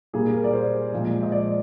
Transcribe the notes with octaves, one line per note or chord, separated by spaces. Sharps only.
A#2 G3 A#3 G#4
A#4
D5
C5
A#2 F3 G#3
D#5
D5